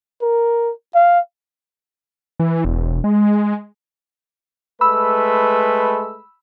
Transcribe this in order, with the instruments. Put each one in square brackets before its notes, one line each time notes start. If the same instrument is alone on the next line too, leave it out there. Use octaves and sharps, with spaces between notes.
[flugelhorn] A#4
F5
[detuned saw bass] E3
E1
G#3
[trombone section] G#3 A3 B4 [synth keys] B5 E6